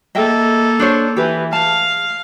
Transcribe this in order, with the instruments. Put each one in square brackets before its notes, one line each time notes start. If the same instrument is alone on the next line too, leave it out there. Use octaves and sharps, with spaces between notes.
[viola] A#3 A4 [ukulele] D#5 E5 G5
[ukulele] D4 C5 C#5
[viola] E3 [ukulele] G4 B4
[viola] F5 [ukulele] A5